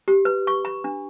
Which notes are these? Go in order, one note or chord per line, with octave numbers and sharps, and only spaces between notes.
G4
B4
C#6
B5
D4